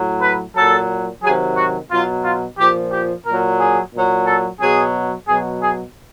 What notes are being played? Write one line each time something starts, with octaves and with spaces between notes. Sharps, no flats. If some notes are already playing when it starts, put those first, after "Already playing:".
Already playing: A2 F#3
B4
A#2 F#3 A4
C3 D#3 F#3 G#4
F#4
B2 F#3 F4
F4
A#2 F3 G4
G4
A#2 F#3 A#4
G#4
A#2 F#3
A4
B2 F#3 G#4
B2 F#3 G#4
G#4